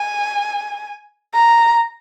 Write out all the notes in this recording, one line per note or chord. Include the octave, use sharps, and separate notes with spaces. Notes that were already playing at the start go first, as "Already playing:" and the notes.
Already playing: G#5
A#5